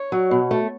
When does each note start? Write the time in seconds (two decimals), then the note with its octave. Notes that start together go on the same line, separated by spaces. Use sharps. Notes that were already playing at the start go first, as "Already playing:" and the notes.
Already playing: C#5
0.12 F#3
0.31 B2
0.51 A3